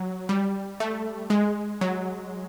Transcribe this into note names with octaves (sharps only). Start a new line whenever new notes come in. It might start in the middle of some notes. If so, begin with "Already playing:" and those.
Already playing: F#3
G3
A3
G#3
F#3